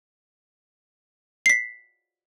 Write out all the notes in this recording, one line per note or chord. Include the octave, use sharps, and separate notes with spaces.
B6 C7